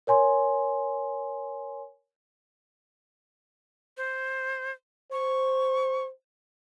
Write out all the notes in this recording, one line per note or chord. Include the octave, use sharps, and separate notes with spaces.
A#4 C#5 G#5 C6
C5
C5 C#6